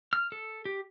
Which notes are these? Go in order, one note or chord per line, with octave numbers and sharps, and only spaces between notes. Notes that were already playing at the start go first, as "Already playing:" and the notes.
F6
A4
G4